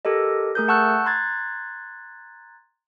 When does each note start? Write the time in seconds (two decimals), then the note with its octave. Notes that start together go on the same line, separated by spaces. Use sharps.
0.05 G4 A4 A#4 D#5
0.55 A3 G#4 A#4 G6
0.68 F#5 A5 C#6 E6 F#6 G6
1.05 A#5 C6 F#6 G#6 A6